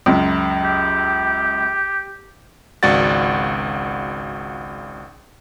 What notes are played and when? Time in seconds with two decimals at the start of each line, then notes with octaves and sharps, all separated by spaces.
0.06 C#2 F#2
0.64 G4
2.83 G#1 C#2 F#4 D5 F#5 A6